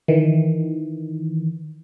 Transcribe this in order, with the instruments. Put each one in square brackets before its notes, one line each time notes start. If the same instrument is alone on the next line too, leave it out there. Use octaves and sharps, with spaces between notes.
[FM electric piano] D#3 E3